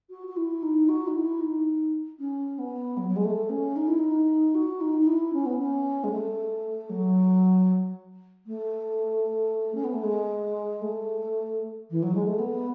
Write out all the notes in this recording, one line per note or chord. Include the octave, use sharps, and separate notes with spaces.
F#4
F#4
E4
D#4
F#4
D#4
E4
D#4
C#4
B3
F#3
F#3
G#3
A3
C#4
D#4
E4
D#4
F#4
D#4
D#4
E4
C#4
B3
C#4
G#3
A3
F#3
A3
C#4
B3
A3
G#3
A3
E3
F#3
G#3
A3
B3